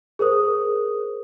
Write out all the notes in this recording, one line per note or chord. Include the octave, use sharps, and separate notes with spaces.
G#4 A#4 C5 D#6